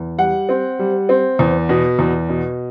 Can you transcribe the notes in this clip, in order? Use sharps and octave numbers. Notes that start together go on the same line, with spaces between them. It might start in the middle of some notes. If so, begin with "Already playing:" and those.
Already playing: E2
G3 F#5
C4
G3
C4
E2
B2
E2
B2